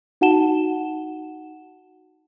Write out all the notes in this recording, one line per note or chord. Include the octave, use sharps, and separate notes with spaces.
D#4 F#4 F#5 A5 E7 G7